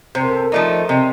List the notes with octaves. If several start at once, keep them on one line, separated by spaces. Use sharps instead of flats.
C3 C5
A#4
A4
A#4
F3 A3 D#4 D5
C3 D#5